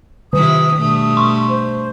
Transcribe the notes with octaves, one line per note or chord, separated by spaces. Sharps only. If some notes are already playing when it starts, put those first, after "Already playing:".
F2 C3 D#3 E4 D#6
G2 B2 A3
C6 C#6
C5